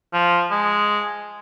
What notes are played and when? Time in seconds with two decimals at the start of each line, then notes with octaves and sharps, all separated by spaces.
0.13 F3
0.51 G#3